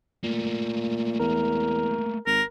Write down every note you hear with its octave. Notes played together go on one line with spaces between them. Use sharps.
A#2 A3 A#3
E2 A#4
G#1 A#4